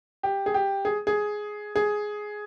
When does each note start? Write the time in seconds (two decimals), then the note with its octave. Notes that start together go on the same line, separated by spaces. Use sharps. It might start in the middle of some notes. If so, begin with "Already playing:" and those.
0.23 G4
0.46 G#4
0.54 G4
0.85 G#4
1.07 G#4
1.76 G#4